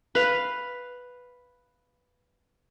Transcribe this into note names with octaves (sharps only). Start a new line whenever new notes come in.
B4 F5